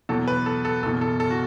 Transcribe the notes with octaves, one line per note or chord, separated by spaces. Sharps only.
E2 B2 F#3 A4
B4
A4
A4
F#1 E2 B2 A4
A4
A4
F#4